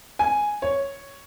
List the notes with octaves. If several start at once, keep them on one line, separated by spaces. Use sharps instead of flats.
G#5
C#5